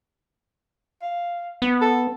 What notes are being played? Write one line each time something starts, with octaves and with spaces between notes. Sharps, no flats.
F5
B3
A4